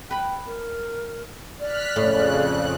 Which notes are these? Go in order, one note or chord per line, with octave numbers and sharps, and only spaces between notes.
B4 G5 B5
A#4
D5 F6 F#6 B6
F2 A2 C#3 F#6